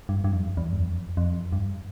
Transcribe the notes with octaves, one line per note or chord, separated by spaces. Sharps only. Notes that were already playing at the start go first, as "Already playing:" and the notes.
G2
G2
F2
E2
G2
F2
F2
G2